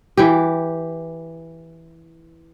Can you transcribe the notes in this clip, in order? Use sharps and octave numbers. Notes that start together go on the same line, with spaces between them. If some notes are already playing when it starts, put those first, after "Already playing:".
E3 G4